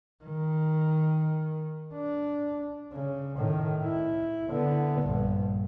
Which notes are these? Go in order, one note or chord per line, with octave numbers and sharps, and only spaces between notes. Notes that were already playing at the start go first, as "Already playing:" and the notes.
D#3
D4
C#3
A2 D#3
E4
D3 B3
A#1 G2